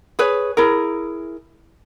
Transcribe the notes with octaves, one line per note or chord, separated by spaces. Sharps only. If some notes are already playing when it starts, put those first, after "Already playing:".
G#4 B4 C#5
E4 G#4 A#4